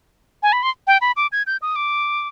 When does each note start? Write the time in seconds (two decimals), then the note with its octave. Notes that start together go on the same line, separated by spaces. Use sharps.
0.43 G#5
0.52 B5
0.63 C6
0.87 G5
1.01 B5
1.16 D6
1.32 G#6
1.46 G6
1.62 D#6
1.76 D6